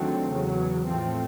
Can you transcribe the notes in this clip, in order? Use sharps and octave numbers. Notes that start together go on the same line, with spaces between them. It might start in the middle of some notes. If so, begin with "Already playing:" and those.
Already playing: D#2 D3 F#3 A3 C4
E2 C#3 F#3
A2 F3 A3 C4